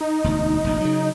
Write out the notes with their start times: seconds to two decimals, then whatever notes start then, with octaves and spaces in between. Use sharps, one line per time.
0.01 D#4
0.24 E1 D2
0.64 F1 A#1
0.81 C#3 F#3